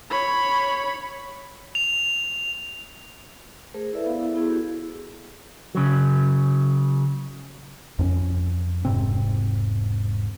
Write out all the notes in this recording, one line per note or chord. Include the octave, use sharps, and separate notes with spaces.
C#5 B5
F7
A3 G#4 A#4 C5
E4 A4 B4 D5 E5
B3 F5
E4 A4
B3 E4 G#4
F#4 G4
C#3 F#3
F2 C4 C#4
E1 G#2 C3 C4